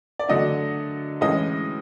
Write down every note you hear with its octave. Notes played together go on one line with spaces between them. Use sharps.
D5
D3 F#3 A3 D4 D#5
A2 E3 G#3 C#4 D#5